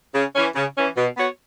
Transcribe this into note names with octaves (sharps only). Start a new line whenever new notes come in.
C#3
E3 C#4
C#3
E3 C#4
B2
B3 F#4 C#5